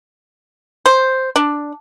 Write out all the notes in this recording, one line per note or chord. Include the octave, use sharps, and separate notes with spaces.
C5
D4